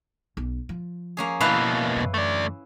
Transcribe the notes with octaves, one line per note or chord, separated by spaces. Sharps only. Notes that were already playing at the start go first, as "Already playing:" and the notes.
B1
F3
A#3 C#4 G#4
B2 A#3 E4 B4 F5
F#2 E3
A3 D5